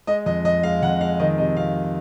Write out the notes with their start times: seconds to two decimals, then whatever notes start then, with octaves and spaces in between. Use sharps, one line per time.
0.07 G#3 D#5
0.26 F2 D#5
0.44 F2 D#5
0.63 G#3 F5
0.82 F2 F#5
1.01 G#3 F5
1.19 D#3 D#5
1.38 C3 D#5
1.57 C3 F5